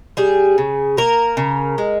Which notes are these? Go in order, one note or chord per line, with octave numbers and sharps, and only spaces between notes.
G3 G#4
C#3
A#3 A#4
C#3
G#3